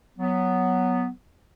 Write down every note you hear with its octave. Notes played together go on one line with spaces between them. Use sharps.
F#3 B3